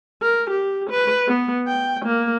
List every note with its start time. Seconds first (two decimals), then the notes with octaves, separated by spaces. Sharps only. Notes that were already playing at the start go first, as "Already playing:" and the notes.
0.22 A#4
0.50 G4
0.90 B4
1.28 B3
1.68 G5
2.05 A#3